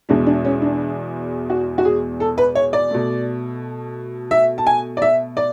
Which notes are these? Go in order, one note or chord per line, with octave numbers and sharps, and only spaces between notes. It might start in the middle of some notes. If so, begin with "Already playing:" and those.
E2 B2 G#3 D4
D4
C#4
D4
F#4
F#4
G#4
A4
B4
C#5
D5
B2 A3
E5
A5
G#5
D5
E5
D5